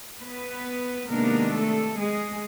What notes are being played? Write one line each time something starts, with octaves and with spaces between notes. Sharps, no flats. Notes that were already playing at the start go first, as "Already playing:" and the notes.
B3 B4
C3 D#3 G#3 A#3 B3 D4 A#4
A3 A4
G#3 G#4